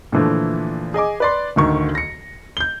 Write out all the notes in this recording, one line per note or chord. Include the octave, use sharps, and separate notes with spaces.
A#2 D3 E3 F3 A3
G#4 D#5 G#5 D6
B4 D5 C6
D1 D2 D#3 C#6
A#6 C#7
G6 G7